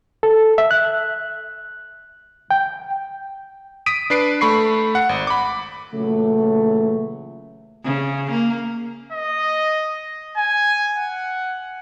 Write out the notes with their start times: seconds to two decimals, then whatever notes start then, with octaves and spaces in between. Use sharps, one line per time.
0.23 A4
0.58 E5
0.71 F#6
2.51 G5
3.86 D#6 B6 D7 D#7
4.10 D4 B4 C7 D7
4.41 A3 B5 C#6 C7
4.95 F#5
5.09 G#1
5.27 B5 D6
5.94 A#2 C#3 E3 F#3 A3
7.84 C#3
8.31 A#3
9.12 D#5
10.37 G#5
10.98 F#5